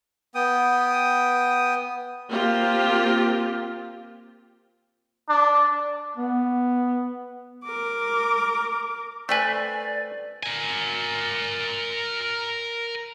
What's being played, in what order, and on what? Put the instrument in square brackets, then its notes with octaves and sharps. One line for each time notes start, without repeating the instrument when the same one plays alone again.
[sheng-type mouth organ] B3 G5 D#6
[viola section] A#3 C4 F4 G4
[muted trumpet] D4
[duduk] B3
[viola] A#4 D6
[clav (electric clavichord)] A3 B4 [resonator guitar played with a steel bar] C5 G5 G#5 [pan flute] D5
[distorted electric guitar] A#4 G#5